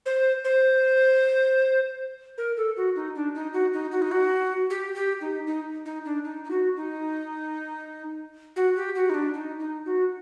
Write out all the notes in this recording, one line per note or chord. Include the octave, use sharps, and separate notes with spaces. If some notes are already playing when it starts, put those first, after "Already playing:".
C5
C5
A#4
A4
F#4
D#4
D4
D#4
F#4
D#4
F#4
D#4
F#4
G4
G4
D#4
D#4
D#4
D4
D#4
D#4
F#4
D#4
F#4
G4
F#4
D#4
D4
D#4
D#4
F#4